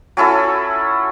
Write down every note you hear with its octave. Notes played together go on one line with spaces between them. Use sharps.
F#3 C#4 E4 A4